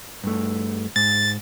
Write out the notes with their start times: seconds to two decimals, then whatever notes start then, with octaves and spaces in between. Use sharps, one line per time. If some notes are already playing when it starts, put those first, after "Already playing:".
0.24 G2 A3
0.96 G#2 A6